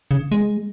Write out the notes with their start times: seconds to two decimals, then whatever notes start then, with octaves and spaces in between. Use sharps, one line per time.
0.11 C#3
0.32 G#3